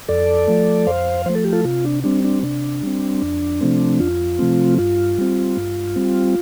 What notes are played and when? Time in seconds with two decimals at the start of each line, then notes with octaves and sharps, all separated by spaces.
0.08 F2 A4 D5
0.48 F3 A3
0.87 F2 C5 F5
1.26 F3 A3 C5
1.35 A4
1.44 G4
1.53 F4 A4
1.64 C3 F4
1.85 D4
2.04 G3 C4 D4
2.24 D4
2.43 C3 D4
2.83 G3 C4
3.22 F2
3.61 C3 F3 A3 C4
4.00 F2 F4
4.39 C3 F3 A3 C4
4.78 G2 F4
5.18 G3 C4
5.57 G2
5.96 G3 C4